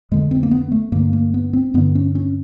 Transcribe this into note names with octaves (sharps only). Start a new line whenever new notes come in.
F2 D3 G#3
C4
A#3
B3
A3
G2 D3 A#3
A#3
B3
C4
G2 D3 B3
C#4
C#4